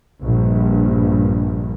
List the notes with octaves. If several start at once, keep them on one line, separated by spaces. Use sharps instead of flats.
A#1 G2